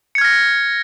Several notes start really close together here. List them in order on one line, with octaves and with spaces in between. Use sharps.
C#7 G#6 F6 A#6